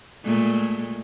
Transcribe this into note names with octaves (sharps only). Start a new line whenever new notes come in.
A#2 G#3 A3